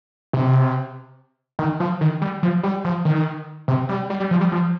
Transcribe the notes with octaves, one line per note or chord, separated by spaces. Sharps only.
C3
D#3
F3
D#3
G3
F3
G3
F3
D#3
C3
G3
G3
G3
F3
G3
F3